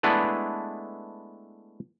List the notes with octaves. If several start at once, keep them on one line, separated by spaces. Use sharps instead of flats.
G#3 A3 B3 D4 E4 B4